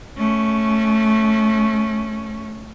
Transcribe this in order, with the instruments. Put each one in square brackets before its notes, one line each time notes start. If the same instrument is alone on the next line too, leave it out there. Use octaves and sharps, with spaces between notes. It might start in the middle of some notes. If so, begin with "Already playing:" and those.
[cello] A3 C#4